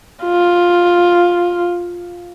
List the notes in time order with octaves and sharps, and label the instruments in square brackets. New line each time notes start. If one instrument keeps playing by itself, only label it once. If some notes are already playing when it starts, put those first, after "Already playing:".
[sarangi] F4